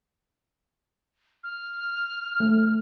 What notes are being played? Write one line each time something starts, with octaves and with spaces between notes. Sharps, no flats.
F6
A3